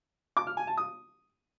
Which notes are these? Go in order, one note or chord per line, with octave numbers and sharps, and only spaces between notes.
D6
F6
G#5
A5
D#6